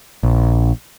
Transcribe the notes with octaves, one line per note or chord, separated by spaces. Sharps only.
A#1